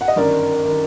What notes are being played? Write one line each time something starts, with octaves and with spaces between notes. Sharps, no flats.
F#5
D#5
G1 F#2 D#3 A#4 D5
D#3